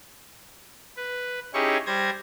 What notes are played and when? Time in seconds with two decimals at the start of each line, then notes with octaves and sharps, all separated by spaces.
0.97 B4
1.54 C#4 D#4 E4 G4 G#4 C#6
1.86 G3 C5 G#6 A#6